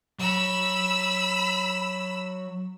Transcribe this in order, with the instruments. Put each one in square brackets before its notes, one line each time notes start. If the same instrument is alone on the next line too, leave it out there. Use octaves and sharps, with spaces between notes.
[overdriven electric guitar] F#3 C#5 [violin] B5 E6